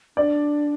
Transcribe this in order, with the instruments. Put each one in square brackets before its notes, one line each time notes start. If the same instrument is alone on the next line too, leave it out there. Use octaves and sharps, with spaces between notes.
[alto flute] D4 [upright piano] D5